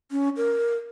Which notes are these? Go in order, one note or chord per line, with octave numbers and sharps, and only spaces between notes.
C#4
A#4